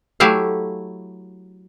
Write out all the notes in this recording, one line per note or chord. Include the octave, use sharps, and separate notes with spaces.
F#3 A3 E4 G4 F5